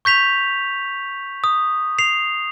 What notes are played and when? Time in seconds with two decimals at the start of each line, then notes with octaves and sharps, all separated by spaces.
0.05 C#6 G6 B6 F7
1.44 D#6
1.99 C7 F7